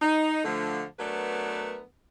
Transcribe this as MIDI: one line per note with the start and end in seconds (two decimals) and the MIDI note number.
0.02 0.43 63
0.45 0.84 50
0.45 0.84 53
0.45 0.84 57
0.99 1.83 54
0.99 1.83 57
0.99 1.83 59
0.99 1.83 62
0.99 1.83 70
0.99 1.83 71